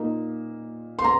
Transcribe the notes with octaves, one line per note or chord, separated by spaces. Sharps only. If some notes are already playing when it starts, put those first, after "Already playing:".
Already playing: A#2 A#3 D#4
C6
A#5